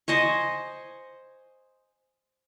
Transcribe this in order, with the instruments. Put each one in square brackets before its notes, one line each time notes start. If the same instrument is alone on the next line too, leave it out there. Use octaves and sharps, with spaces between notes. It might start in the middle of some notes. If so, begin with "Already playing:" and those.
[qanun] C5 D#5 G#5 C#6